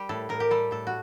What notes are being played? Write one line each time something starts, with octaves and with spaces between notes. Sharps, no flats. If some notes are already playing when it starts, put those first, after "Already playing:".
Already playing: G3 G4
A2 A4
A2 A#4
G4
G3 A4
A2 A4
F#4